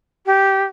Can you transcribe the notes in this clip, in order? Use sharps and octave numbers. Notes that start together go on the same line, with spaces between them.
G4